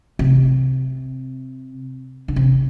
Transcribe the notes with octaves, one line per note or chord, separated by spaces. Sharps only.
C3
D3
C3